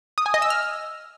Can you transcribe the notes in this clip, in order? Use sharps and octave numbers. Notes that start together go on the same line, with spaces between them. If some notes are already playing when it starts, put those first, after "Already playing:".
D#6
G#5
D#5
E6
F6